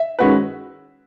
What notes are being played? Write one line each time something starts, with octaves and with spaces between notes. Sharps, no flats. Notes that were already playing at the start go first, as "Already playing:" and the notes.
Already playing: E5
D#3 G#3 C#4 F#4 B4